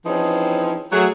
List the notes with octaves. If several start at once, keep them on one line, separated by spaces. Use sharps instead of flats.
E3 F3 C4 C#4 D#4 G#4
F#3 A3 G#4